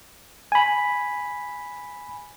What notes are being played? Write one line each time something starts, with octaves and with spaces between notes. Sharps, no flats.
G#5 B5